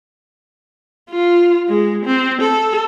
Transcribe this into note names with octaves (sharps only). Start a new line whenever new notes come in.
F4
G#3
C4
A4